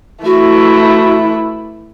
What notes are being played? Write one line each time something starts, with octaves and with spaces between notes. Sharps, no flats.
E3 A3 E4 F#4